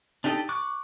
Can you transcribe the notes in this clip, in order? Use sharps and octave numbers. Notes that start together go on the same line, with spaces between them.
D4 D#4 G4 A4 D#5
C#6 D6 F#6